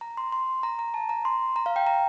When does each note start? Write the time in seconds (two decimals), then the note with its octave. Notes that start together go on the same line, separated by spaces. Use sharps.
0.01 A#5
0.17 C6
0.32 C6
0.63 A#5
0.79 A#5
0.94 A5
1.09 A#5
1.25 C6
1.56 A#5
1.66 F5
1.76 G5
1.87 A#5